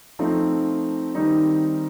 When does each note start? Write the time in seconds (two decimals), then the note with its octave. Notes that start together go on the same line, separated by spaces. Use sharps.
0.19 F3 A3 C4 D#4
1.15 D#3 G3 C4 D#4